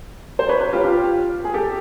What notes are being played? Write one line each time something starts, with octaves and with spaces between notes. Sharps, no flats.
C5
B4 C#5
B4 C#5
F4 G4
F4 G4
G#4
G4 A4